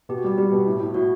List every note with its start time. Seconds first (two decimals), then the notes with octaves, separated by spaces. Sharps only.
0.09 B2 G4
0.18 F#4
0.24 G3 G4
0.38 G3 G4
0.52 B2
0.66 A2
0.80 A2
0.94 A2 F#4